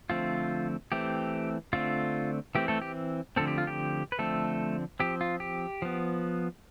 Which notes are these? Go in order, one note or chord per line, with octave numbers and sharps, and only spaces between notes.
D3 F3 A3 C4 F4
E3 A3 C4 G4
D3 A3 C4 F4
E3 A3 C4 G4
A3 A4
G4
D3 F3 A3 C4 A4
G4
F4
G4
B4
D3 F3 A3 C4 A4
F3 C4 G4
F4
G4
F3 B3